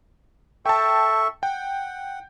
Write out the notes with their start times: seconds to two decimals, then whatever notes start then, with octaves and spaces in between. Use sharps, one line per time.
0.66 A4 E5 G5 A5 C#6
1.43 F#5 G5